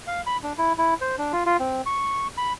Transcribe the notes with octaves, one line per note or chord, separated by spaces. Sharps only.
F5
B5
D4
E4
E4
C5
D4
F4
F4
C4
C#6
B5